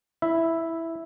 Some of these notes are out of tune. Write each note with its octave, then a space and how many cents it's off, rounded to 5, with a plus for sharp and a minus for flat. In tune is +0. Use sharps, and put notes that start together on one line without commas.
E4 +0 E5 +0